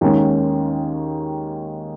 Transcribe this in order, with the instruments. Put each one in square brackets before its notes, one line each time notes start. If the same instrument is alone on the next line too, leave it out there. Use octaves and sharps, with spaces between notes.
[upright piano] D#2 D#3 G#3 C#4